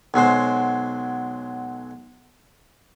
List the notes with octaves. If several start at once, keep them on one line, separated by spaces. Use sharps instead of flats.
B1 F#3 G#3 C5